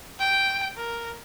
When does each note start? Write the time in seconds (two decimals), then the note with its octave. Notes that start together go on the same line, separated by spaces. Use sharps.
0.20 G5
0.77 A#4